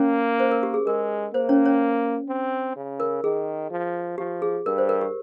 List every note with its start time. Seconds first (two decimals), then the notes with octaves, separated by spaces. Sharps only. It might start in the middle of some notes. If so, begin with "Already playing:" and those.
Already playing: A#3 C#4 C#5
0.40 C5
0.51 A#4
0.63 G4
0.74 G#4
0.86 G#3 A#4
1.34 A#3 C5
1.49 C#4 C#5
1.65 C#4 C#5
2.29 C4
2.76 C#3
3.00 A#4
3.24 D#3 G#4
3.71 F3
4.18 F3 G4
4.42 G#4
4.66 G2 A#4
4.78 C5
4.89 A#4
5.01 G4